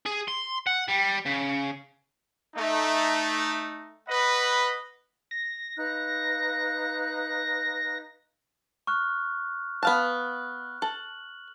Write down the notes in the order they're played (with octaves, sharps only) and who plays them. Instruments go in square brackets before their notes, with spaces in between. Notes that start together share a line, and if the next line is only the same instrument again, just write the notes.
[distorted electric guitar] G#4
C6
F#5
G3
C#3
[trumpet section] A3 D#4
B4 D#5 F#5 B5
[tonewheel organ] A#6
[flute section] D#4 B4 F5 [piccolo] F#6
[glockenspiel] C#6 F6 F#6
[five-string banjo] B3 F5 A5 [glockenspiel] F#6
[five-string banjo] A4 [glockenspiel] F#7